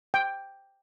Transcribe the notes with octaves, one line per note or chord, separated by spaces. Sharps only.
G5